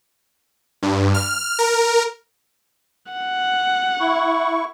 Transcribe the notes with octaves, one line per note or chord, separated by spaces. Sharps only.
G2
F6
A#4
F#5
E4 C#6